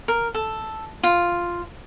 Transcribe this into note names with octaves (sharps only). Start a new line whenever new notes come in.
A#4
A4
F4